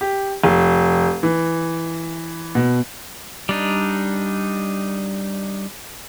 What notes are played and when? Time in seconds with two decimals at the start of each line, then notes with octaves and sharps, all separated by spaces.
0.01 G4
0.44 F1
1.23 E3
2.55 B2
3.49 G3 D4 D#4